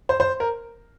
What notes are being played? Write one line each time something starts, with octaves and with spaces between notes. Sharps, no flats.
C5
C5
A#4